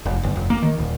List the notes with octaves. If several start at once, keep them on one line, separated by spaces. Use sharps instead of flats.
F1
G1
F1
A#3
D#3
D#1